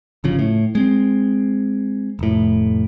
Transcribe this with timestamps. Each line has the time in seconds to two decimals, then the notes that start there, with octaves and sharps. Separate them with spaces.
0.24 G1 C#3 F3
0.39 A2
0.75 G#3 C4
2.19 F1 A2